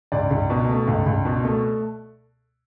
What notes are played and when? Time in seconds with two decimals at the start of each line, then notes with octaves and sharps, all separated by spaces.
0.12 C#2 D5
0.30 C#2
0.50 B2
0.69 A3
0.87 C#2
1.06 C#2
1.25 B2
1.44 A3